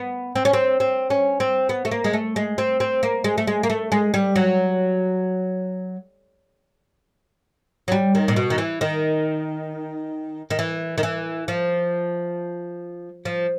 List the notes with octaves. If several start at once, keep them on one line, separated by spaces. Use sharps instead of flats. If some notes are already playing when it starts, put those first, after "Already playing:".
Already playing: B3
C4
C#4
C4
C4
C#4
C4
B3
A3
A#3
G#3
A3
G#3
C4
C4
A#3
G#3
A3
G#3
A#3
A3
G#3
G3
F#3
F#3
G3
D#3
A#2
B2
D#3
E3
D#3
D#3
E3
D#3
E3
F3
F3